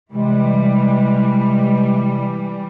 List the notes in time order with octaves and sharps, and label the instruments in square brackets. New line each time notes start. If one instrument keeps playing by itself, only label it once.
[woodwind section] C3 G#3 [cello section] E3 G3